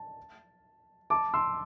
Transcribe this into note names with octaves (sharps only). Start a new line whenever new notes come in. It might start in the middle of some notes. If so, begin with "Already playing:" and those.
Already playing: A5
A5 D6
C6 E6